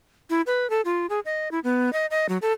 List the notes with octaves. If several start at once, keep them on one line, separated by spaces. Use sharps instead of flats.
E4
B4
A4
F4
G#4
D#5
E4
B3
D#5
D#5
F#3
A4